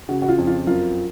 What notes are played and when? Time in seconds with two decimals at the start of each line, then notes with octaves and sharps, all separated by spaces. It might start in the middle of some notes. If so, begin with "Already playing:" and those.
0.09 C#3 F#4
0.22 F#4
0.28 F4
0.38 F2
0.47 F4
0.67 F#2 F4